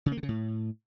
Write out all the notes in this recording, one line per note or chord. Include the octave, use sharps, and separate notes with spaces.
C#3
A#3
D3
C#3
A2